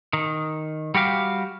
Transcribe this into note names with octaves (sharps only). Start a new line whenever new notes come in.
D#3
G3 F#4 G4 F5